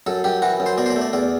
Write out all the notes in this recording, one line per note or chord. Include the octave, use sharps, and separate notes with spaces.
F#2 A4
F#2 G4
E3 F#4
F#2
C5
B2 D5
C5
D5
A3
D5
E2 D5